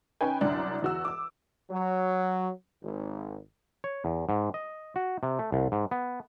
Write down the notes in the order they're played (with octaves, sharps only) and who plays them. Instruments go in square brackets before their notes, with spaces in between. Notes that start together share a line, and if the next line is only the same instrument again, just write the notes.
[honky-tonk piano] C#4 D#4 B4 G5 G#5
C2 F#2 D4
E2 F#4 E6
D6 E6
[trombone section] F#3
G#1
[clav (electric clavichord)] C#5
E2
G#2
D#5
F#4
C3
A3
C2
G#2
B3